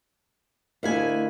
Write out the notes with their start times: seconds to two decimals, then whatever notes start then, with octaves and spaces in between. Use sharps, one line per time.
0.83 D2 E4 A#4 D#5 F5 G#5